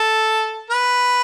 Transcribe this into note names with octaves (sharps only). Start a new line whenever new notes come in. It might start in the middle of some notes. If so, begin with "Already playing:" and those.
Already playing: A4
B4